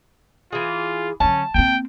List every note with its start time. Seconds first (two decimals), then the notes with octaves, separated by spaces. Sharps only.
0.52 E3 F4 G#4
1.20 D3 F#3 C#4 A5
1.55 A#3 C4 G5